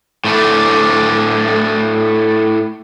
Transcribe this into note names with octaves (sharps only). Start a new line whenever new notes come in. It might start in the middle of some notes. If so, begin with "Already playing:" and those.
A2 A3 D4